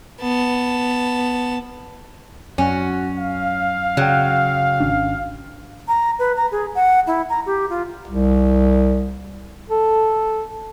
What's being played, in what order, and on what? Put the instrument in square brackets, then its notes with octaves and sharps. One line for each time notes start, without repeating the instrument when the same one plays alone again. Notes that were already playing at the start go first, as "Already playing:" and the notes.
[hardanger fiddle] B3 A5
[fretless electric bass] F#2 [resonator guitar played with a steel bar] C#4 [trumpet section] F#4
[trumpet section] F5
[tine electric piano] C#3 G5 [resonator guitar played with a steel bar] F#3
[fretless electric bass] G#1 C#4 D4
[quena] A#5
B4
A#5
G#4
F#5
E4
A#5
G4
F4
[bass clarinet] C2
A4